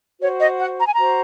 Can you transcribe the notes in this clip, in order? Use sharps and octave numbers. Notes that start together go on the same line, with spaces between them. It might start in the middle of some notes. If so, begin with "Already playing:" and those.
F#4 C5 C#5
D#5
F#5
A#5
G#5
F#4 C5 A#5